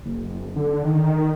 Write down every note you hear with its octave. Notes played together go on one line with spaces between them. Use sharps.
F#1
D3
D#3